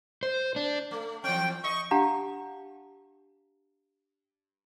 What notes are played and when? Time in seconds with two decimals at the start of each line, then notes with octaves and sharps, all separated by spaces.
0.23 C5
0.56 D4
0.91 A3
1.24 E3 C4 G5
1.64 D#5 C#6
1.91 D4 G4 F5 F#5 A5 A#5